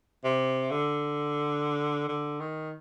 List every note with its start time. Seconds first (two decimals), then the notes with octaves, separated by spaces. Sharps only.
0.24 C3
0.71 D3
2.09 D3
2.40 D#3